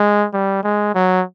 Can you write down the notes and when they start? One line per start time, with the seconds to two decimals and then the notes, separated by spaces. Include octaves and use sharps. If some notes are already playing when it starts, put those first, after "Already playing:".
Already playing: G#3
0.34 G3
0.63 G#3
0.95 F#3